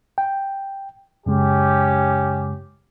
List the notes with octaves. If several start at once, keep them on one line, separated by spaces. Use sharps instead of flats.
G5
F#2 C#3 G#3 C#4 G4